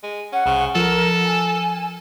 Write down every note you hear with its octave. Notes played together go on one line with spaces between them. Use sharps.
G#3
C#4 F#5
C2 C#3
F3 A4 A#4
G#5